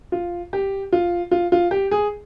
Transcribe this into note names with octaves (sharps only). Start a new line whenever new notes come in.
F4
G4
F4
F4
F4
G4
G#4